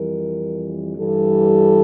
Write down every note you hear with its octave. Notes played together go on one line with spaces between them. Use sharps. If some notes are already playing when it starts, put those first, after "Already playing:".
Already playing: F2 E3 G3 A#4
G2 E3 G3 A4